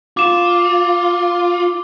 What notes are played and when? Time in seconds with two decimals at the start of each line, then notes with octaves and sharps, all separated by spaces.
0.17 F4 D6 E7